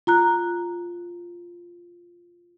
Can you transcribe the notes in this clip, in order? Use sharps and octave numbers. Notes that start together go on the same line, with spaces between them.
F4 A#5 F#6